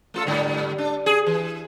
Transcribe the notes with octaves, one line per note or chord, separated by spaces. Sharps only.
A3 F4 A4
G#2 D3 G3
D4
G#4
E3